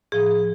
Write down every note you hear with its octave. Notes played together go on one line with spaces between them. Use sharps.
A2 F3 G#4